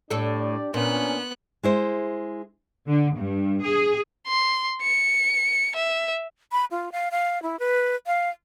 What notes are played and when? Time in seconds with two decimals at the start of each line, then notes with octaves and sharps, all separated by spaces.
0.10 A2 D4 G4 A4 D5
0.74 A#2 B3 C#4 D4 F#6
1.63 G#3 E4 C5
2.87 D3
3.18 G2
3.63 G#4
4.27 C6
4.82 C#7
5.76 E5
6.52 B5
6.71 F4
6.92 F5
7.11 F5
7.43 E4
7.59 B4
8.07 F5